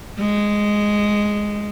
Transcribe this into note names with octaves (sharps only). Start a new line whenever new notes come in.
G#3